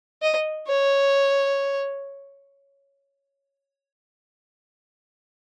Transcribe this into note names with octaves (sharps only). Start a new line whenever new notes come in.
D#5
C#5